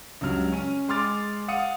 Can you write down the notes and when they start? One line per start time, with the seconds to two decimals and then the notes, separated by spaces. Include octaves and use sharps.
0.21 C#2 G2 F#3 F6
0.52 C#4 D#7
0.88 G#3 G#5 C6 D6 F6 A6
1.48 F5 F#5 D#6 C#7 D#7